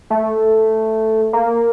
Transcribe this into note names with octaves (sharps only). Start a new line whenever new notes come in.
A3
A#3